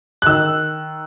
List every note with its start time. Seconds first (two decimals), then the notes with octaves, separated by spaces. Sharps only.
0.22 F#6
0.26 D#3 E6